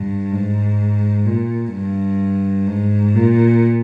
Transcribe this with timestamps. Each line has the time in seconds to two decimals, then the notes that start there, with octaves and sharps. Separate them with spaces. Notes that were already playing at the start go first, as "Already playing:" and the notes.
Already playing: G2
0.32 G#2
1.26 A#2
1.73 G2
2.67 G#2
3.15 A#2